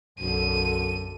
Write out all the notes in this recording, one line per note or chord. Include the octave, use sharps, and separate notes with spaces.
B1 F#2 D3 D#7